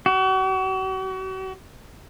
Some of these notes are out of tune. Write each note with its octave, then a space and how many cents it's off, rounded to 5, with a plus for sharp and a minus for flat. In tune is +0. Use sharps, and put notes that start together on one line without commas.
F#4 +40